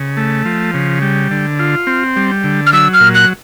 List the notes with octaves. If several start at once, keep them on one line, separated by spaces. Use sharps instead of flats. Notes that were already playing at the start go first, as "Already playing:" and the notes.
Already playing: C#3
A3
F3
C#3
G3
D3
F4
C4
G3
D3
F6
F#3 E6
F6
A#2
F#6